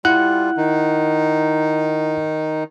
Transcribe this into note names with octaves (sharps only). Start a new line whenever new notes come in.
G3 E4 F4 F#5 F#6
D#3 D#4